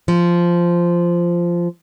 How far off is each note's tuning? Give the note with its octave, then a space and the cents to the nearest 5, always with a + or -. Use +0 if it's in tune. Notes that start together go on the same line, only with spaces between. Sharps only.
F3 -10